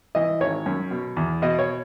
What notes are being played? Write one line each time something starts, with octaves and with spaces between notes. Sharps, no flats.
E3 D#5
G#1 C#5
F#2
B2
E2
B2 D#5
C#5